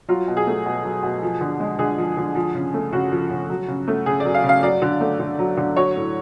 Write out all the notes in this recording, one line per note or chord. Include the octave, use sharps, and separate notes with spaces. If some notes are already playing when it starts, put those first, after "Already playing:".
F#3 F4
B2
G#4
A3
B2
F#3
B2
F3
D3
G#3
D3 G#4
F3
D3
F3
C#3
A3
C#3 F#4
F3
C#3
F#3
C#3
A3
C#3 G#4
F#3 D5
F5
C#3
F5
F#3 D5
D3
A3
D3
F#3
D3
F#3 C#5
A2